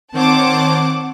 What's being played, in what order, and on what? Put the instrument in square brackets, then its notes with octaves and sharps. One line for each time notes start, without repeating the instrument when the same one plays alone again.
[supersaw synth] D#3 C5 C#5 [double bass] C4 [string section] F#5 A5 D6